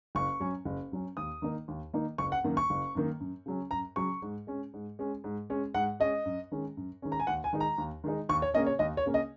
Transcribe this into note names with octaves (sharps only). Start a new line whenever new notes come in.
F#1 C#6
F#2 F#3 C#4
F#1
F#2 F#3 C#4
D#2 D#6
D#3 A#3 D#4
D#2
D#3 A#3 D#4
F#1 C#6
F#5
F#2 D#3 A#3
C#6
F#1
F#2 D#3 A#3
F#2
C#3 F#3 C#4
F#2 A#5
C#3 F#3 C#4 C#6
G#2
G#3 C#4
G#2
G#3 C#4
G#2
G#3 C#4
G#2 F#5
G#3 C#4 D#5
F#2
D#3 G#3 C#4
F#2
D#3 G#3 C#4
A#5
G#5
D#2 F#5
G#5
D#3 G#3 D#4
A#5
D#2
D#3 G#3 D#4
D#2 C#6
C#5
C#3 A#3 C#4 D#5
C#5
D#2 D#5
C#5
C#3 A#3 C#4
D#5